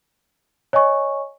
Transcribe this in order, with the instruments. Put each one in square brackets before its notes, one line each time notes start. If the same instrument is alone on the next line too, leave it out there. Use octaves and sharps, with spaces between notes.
[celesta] C#5 D#5 G#5 C#6